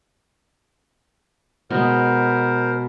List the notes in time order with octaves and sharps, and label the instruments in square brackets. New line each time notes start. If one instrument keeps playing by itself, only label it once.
[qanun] B2 G#3 [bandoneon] A#4 C5